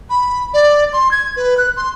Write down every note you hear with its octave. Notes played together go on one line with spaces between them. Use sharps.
B5
D5
C6
G#6
B4
F#6
C6